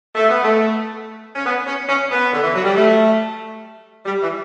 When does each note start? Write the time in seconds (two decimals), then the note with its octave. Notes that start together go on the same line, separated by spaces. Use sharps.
0.15 A3
0.29 B3
0.42 A3
1.35 C#4
1.45 B3
1.66 C#4
1.89 C#4
2.10 B3
2.33 D3
2.43 E3
2.54 F#3
2.65 G3
2.75 A3
4.06 G3
4.22 E3